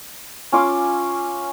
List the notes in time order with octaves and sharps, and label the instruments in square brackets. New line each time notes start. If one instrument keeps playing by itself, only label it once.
[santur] C#4 F4 D6